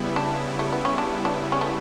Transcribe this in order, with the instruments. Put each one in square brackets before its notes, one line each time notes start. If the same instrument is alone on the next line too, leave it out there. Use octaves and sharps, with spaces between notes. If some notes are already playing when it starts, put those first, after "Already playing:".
Already playing: [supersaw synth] C#3 G3 B3 E4
[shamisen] D4
A3
B3
C#4
D4
D4
C#4
A3